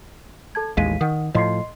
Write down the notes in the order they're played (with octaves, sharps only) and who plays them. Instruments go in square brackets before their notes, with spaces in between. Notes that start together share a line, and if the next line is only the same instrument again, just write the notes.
[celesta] A4 A5 G#6
[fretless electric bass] A1 D#2 G#3 [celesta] F5 B6 D#7
[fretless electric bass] D#3 [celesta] F#5 D#6
[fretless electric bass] A2 F3 [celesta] D#5 C6 C7